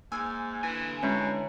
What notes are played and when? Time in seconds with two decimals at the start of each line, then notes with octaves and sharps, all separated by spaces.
0.12 G#2 A#3 G#5 E6 G#6
0.63 D3 E3 G#5 A6
1.03 B2 G#3 C#4 E4 C#5 E5 A#5